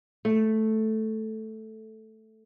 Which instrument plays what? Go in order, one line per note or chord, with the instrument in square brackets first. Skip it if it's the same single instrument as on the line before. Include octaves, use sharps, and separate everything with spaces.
[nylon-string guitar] A3